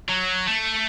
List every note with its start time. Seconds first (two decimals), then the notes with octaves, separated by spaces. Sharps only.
0.09 F#3
0.48 A3